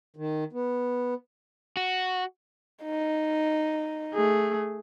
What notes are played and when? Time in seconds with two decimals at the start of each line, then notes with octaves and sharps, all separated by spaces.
0.16 D#3
0.53 B3
1.77 F#4
2.83 D#4
4.14 A3 G#4